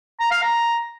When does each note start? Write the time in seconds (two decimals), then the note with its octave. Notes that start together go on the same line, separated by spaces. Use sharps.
0.20 A#5
0.31 F5
0.42 A#5